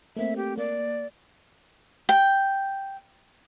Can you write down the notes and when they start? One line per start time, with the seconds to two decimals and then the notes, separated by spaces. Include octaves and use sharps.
0.17 A3 A#3 C4 E5
0.36 G4
0.57 A#3 D5
2.09 G5